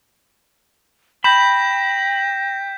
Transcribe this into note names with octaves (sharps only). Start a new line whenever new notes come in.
G5 B5 G6 A#6 B6 E7